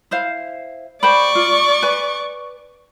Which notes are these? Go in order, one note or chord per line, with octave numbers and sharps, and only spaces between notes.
E4 C5 F5
C5 D5 G5 B5 C#6
F4
B4 G#5